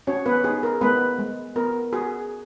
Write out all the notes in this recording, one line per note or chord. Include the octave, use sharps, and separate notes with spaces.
C#4 F#4 C#5
B3 B4
D#4 G#4
A#4
G#3 B3 B4
G#3
B3 A#4
F#4 G#4